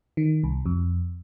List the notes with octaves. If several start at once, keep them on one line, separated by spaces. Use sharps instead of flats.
D#3
C2
F2